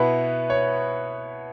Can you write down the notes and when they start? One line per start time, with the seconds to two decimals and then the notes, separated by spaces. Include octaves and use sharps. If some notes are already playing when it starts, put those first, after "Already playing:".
Already playing: B2 B3 E4 B4
0.50 C#5